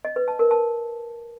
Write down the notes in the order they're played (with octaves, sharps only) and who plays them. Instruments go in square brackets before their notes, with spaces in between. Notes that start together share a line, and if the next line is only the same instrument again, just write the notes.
[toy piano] D#5
B4
A5
A#4
A5